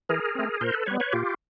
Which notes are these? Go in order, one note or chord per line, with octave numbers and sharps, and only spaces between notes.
E3 G#4 A#4
A3 C4
A#2 A#4 C5
A4 B4
G3 B3 B4 C#5
B4 C#5
A#2 F4 G4